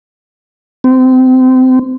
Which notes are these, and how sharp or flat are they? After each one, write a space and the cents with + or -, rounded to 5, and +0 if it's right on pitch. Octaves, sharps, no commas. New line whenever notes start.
C4 -25